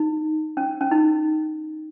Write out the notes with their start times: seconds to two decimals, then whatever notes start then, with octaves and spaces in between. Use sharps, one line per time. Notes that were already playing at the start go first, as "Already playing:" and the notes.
Already playing: D#4
0.57 C#4
0.81 C#4
0.91 D#4